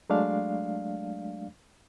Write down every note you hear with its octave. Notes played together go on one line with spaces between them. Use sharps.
F#3 G#3 A3 D4 D5 F5